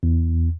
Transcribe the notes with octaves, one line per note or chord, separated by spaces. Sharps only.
E2